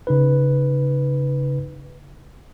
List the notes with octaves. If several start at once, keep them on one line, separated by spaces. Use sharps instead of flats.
C#3 D#4 B4